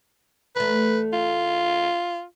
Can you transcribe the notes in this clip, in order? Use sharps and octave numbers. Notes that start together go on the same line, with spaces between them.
E2 A3 B4
F4